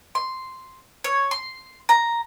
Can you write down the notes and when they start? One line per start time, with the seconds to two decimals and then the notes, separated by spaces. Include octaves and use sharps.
0.15 C6
1.04 C#5
1.31 C6
1.89 A#5